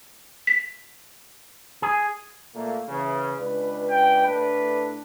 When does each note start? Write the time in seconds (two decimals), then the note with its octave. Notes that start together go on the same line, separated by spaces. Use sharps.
0.47 B6
1.82 G#4
2.55 A#2 A3 A#3
2.88 C#3 E3
3.38 C#2 D4 B4
3.91 G5
4.26 A2 D4 B4